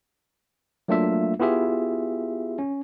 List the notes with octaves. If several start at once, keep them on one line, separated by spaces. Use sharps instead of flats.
F#3 A3 A#3 D4 F4 E5
B3 E4 F4 G4 G#4 E5
C#4